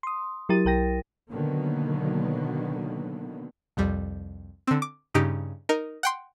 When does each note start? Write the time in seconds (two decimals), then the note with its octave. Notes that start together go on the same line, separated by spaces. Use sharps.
0.03 C6 D#6
0.49 F#3 E4 G4 A#4 A6 D#7
0.65 B1 A#4 G5 A#6
1.31 B2 D3 D#3 F#3 A#3 B3
3.77 C2 F2 G3
4.67 D3 C4
4.82 D6
5.14 G2 C#3 D#4 G4 D7
5.69 D#4 A#4
6.03 F#5 G5 C6